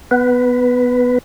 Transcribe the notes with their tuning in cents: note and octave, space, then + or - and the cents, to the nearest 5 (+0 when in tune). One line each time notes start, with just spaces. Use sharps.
B3 +10 B4 +0